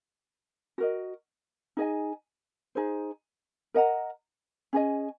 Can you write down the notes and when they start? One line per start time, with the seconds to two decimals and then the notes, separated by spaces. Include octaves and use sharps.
0.78 F#4 A#4 D#5
1.77 D#4 G#4 D#5 G#5
2.75 D#4 G#4 C5
3.74 A#4 D#5 F#5 A#5
4.73 C#4 G#4 D#5 G#5